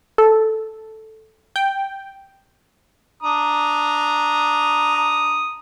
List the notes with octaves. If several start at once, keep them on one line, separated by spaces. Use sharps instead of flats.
A4
G5
D4 A#5 D#6